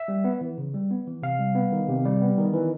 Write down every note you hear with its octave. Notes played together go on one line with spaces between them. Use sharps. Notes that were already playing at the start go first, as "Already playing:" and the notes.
Already playing: E5
G3
B3
E3
C#3
G3
B3
E3
C3 F5
G3
B3
D#3
C3
G3
B3
D#3
E3